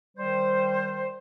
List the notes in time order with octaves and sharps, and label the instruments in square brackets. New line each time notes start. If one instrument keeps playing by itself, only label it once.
[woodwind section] D#3 G3 C5